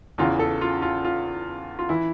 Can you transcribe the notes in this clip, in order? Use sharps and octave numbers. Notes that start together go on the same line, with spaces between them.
E2 C#3 E3 F4
A4
F4
F4
F4
F4
E3 E4